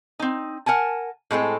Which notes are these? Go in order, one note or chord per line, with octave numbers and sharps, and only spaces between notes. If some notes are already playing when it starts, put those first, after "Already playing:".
C4 D#4
A#4 F#5 G#5 A5
A2 G#3 C4 A4